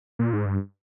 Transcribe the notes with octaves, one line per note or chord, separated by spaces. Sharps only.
A#2
G#2
G2